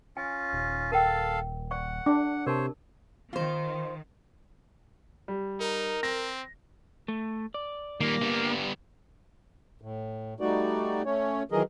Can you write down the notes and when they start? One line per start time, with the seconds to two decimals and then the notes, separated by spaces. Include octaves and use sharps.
0.17 C#4 F4 G#5
0.53 D#1
0.92 A4 A#4 F5 G5 A5
1.71 D5 F#5 C#6
2.06 D4 D6
2.46 C3 A#4 C5 C#5 A5
3.33 D#3 F4 C5
5.28 G3
5.60 D#4 A#4
6.03 C4 A#6
7.08 A3
7.54 D5
8.00 D#3 G3 A#3
8.21 G2 G3 B3
9.81 A2
10.40 G3 A3 D#4 F#4 D5
11.05 A3 C#4 C#5
11.52 D#3 E3 F#3 G#4 A#4 D#5